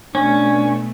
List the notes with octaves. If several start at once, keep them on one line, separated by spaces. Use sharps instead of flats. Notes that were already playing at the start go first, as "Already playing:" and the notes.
B2 A3 C#4 D4